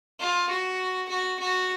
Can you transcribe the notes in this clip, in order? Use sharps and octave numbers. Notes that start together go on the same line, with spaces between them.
F4
F#4
F#4
F#4